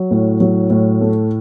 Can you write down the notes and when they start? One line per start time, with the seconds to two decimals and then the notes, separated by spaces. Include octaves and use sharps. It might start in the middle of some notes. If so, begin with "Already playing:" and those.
Already playing: F#3
0.11 A2
0.40 F#3
0.70 A2
1.01 A3